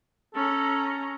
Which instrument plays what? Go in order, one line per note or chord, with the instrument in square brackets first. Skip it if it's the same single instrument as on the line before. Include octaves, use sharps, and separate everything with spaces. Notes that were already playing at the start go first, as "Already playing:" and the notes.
[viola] C#4 A#5 [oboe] A4